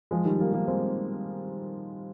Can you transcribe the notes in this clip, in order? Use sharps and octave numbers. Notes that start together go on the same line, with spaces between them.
F3 G#3
D#3 G3
G3 A#3
G3 A#3
G#3 C4